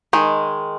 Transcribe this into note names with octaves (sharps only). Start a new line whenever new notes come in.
D#3 G#3